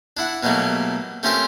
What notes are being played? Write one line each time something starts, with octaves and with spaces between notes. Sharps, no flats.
D4 E4 F#5
B2 F#3 G3 A3 A#3
A3 C4 C#4 F4 G4 A#4